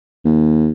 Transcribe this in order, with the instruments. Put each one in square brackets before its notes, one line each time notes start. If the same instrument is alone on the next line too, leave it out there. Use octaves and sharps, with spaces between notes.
[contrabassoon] D#2